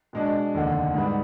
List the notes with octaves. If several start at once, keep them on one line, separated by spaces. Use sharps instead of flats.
B2 G#3 D4
F1 D#2 D3
G#2 G3 B3